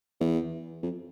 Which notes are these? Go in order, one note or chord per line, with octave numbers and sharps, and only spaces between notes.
E2
F2